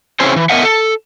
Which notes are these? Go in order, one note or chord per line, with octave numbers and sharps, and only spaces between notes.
C#3 C4 C#4 E4 G#4 C5
E3
B3 A#4 D#5 E5 F#5
A4